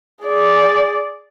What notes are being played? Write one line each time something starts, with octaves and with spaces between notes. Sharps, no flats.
G#4 D5